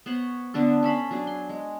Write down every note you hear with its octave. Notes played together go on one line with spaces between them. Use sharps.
B3 C5 C#5 F#5
D3 B3 D4 A4
C#4 A4 B5 C6
F#3 D4 G#4
C6
G#3